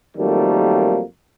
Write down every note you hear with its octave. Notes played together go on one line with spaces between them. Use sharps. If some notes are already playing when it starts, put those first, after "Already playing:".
F2 D#3 F#3 G3 A3 A#3